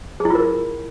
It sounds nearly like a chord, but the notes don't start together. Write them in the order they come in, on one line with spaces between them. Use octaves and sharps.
G#4 E4 F4 A#4